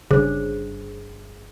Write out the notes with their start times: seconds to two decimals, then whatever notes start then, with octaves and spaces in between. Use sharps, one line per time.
0.11 G1 C#3 G3 D4 G#4 C5